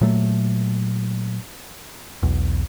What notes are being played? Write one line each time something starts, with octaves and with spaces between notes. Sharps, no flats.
A#2 F#3 A3
B1 E2